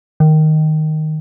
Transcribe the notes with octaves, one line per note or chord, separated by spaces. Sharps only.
D#3